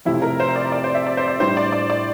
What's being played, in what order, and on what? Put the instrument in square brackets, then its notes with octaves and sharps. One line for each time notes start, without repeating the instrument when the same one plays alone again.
[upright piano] F2 C3 F3 A3 [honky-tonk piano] E4
[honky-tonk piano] A#4
C5
D5
D5
C5
E5
D5
C5
D5
[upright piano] A2 G3 D4 [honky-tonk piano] C5
[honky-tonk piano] D5
D5
D5